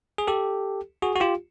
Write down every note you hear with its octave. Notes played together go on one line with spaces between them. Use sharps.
G#4
G4 A4
F#4 G#4
F#4
F4 G4